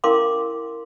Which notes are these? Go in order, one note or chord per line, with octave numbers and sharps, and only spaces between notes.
C#4 E4 A#4 F5 C6 D6